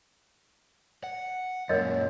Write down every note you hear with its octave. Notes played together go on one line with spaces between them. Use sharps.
F#5
F#2 A#2 A#4 C#5 D#5